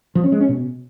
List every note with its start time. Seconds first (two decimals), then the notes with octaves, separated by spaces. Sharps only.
0.15 F3
0.24 C#4
0.32 G#3
0.40 C#4
0.49 B2